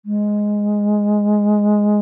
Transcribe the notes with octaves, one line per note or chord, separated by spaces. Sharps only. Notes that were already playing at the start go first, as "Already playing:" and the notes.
G#3